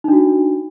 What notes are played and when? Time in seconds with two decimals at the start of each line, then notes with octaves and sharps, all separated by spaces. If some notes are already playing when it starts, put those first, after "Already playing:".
0.04 D#4
0.08 D4
0.12 F#4